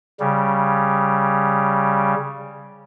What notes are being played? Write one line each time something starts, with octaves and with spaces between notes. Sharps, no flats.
C#3 G3